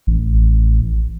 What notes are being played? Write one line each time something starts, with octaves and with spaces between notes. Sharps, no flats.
A1